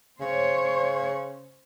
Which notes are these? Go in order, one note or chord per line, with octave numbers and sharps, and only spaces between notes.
C#3 C5 C#5